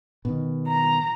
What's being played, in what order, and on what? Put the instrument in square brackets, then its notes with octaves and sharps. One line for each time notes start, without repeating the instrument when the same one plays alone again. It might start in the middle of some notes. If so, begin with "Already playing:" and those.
[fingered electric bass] B2 D#3
[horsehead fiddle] A#5